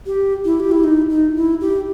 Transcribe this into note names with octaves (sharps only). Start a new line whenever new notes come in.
G4
E4
G4
E4
D#4
D#4
E4
G4